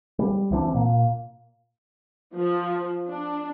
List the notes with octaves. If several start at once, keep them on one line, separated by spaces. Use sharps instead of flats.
G3
C#2 E3 C4 D4
A#2 A#3
F3
D4